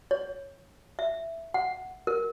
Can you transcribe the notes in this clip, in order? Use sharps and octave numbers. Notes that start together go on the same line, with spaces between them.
C#5
E5
F#5
A#4